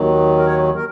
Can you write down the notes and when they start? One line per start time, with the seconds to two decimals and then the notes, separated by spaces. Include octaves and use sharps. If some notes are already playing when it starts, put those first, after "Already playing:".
Already playing: D#2 D#3 F#3
0.38 A#4
0.46 C#5
0.76 A#4